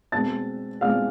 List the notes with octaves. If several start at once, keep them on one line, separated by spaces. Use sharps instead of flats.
B2 G#3 C4 A5 A6
B2 G#3 C4 F5 F6